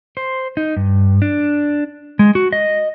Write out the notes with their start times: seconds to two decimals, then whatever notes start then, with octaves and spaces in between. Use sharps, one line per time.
0.17 C5
0.57 D#4
0.77 G2
1.22 D4
2.19 G#3
2.35 F#4
2.53 D#5